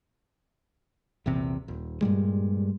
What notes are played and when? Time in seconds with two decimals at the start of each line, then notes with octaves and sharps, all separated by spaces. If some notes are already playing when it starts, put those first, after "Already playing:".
1.26 A#1 E2 C3
1.68 D#1
2.01 G2 A#2 G3 G#3